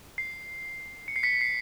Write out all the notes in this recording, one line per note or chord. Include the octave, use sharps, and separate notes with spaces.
C7
C#7
C7
B6 C#7
C7